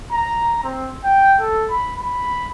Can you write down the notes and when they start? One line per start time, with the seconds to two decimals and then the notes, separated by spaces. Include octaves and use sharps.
0.12 A#5
0.63 C4
1.04 G5
1.40 A4
1.70 B5
2.02 B5